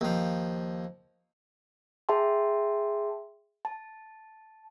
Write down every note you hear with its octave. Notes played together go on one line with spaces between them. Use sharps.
D#2 F3
G#4 E5 G5 A5 C6
A5